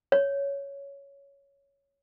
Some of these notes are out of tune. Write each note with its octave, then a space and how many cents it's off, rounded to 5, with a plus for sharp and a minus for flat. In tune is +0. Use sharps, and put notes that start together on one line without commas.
C#5 +10